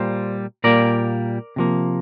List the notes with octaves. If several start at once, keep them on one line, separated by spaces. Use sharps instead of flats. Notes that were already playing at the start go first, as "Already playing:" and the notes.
Already playing: A#2 G3 A#3 C5
A#2 G3 A#3 A#4 D5
C3 F3 A#3